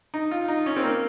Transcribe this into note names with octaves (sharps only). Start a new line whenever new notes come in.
D#4
F4
D#4
C#4
C4
A#3